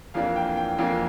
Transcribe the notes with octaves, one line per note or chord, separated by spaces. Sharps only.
F2 E3 A#3 D4 F5
G5
G5
F2 E3 A#3 D4 F5